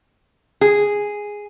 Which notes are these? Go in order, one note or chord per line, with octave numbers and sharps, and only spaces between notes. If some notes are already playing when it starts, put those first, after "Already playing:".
G#4